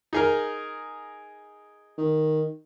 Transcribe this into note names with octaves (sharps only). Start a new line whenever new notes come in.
D#4 G#4 A#4
D#3